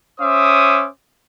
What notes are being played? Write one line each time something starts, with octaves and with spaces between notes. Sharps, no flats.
C#4 C5 E5 D6 D#6